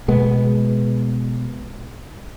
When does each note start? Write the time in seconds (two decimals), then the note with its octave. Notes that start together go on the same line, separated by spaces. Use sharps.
0.08 B2 G#3 B3